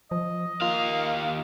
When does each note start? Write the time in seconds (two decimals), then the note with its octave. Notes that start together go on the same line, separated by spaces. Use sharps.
0.11 F3 D#5
0.62 D#2 A#3 F4 F5